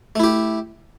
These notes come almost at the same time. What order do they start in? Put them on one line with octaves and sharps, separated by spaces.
A3 E4 G4